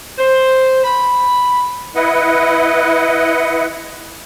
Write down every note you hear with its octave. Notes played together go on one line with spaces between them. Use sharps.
C5
B5
E4 B4 D#5 F#5